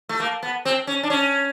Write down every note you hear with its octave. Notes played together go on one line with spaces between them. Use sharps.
A3
A#3
B3
C4
C#4
D4
C#4